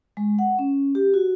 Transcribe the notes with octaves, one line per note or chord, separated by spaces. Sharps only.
G#3
F#5
C#4
G4
F#4